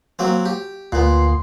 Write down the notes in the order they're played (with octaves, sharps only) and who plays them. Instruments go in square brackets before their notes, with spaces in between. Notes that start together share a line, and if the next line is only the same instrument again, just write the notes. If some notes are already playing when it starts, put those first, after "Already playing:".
[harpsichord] F#3 A#3 C4
G4
[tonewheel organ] D2 C6 [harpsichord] A#2 B3